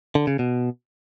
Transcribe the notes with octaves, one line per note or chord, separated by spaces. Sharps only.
D3
C#3
B2